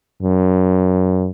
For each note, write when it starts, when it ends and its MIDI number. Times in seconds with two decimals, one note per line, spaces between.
0.22 1.31 42